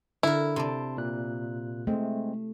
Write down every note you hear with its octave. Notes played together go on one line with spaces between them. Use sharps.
D3 E4 A#4
C3 D5 A5 C6
A#2 F#6
G#3 A3 C4